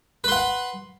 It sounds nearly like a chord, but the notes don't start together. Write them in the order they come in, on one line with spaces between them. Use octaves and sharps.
B4 C6 F#5